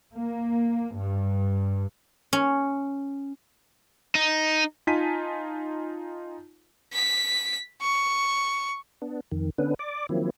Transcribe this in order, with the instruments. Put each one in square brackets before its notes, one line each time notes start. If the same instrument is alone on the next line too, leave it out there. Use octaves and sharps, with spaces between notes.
[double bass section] A#3
G2
[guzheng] C#4
[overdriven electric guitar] D#4
[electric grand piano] D#4 F4 G#5 A5 B6 D#7
[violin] B6
C#6
[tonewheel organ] B3 D4
F2 D#3
D3 B3 C#4 D4 B4
D5 D6
D#3 F3 F#3 A#3 C4 E4